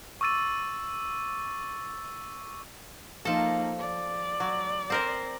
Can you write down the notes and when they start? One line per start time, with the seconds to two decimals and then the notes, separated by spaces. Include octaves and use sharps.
0.21 C#6 D6 E6 A6 D#7
3.25 F3 A#3 D#4 A4
3.79 D5
4.40 F#3
4.90 C4 A#4 C5